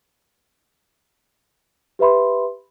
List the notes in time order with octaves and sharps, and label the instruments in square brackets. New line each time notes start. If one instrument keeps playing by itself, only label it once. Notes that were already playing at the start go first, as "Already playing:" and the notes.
[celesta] G4 B4 E5 B5 C6